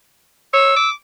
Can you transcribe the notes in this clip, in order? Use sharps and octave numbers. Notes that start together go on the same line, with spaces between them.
C#5 E6
D6